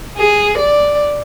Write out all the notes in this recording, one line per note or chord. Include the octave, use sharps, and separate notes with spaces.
G#4
D5